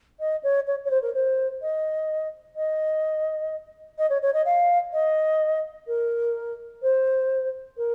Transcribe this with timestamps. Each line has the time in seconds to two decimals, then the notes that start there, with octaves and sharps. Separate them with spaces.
0.20 D#5
0.43 C#5
0.67 C#5
0.85 C#5
0.91 C5
1.02 A#4
1.14 C5
1.62 D#5
2.56 D#5
3.98 D#5
4.10 C#5
4.22 C#5
4.34 D#5
4.45 F5
4.93 D#5
5.87 A#4
6.82 C5
7.77 A#4